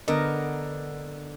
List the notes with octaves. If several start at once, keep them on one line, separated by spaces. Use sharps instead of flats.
D3 B3 A#4 D#5